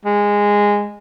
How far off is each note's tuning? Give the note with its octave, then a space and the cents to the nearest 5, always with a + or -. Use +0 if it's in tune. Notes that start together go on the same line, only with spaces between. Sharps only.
G#3 -15